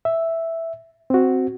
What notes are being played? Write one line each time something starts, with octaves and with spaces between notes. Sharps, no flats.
E5
C4 F#4